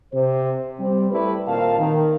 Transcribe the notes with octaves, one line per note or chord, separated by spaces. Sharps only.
C3 C5
G3 C4
G3 A3 E4 G4 B4 D5
A#2 D#3 C4 A#4 F5 A5
D#3